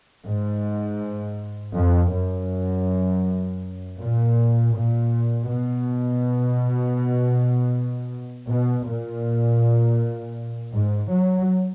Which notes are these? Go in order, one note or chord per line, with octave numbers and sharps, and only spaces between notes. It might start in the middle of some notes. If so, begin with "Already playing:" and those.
G#2
F2
F#2
A#2
A#2
B2
B2
A#2
G#2
F#3